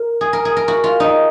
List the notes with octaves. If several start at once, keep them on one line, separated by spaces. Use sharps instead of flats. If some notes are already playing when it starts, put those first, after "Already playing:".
Already playing: A#4
G#4
A#4
G#4
A#4
F#4
F4
D#4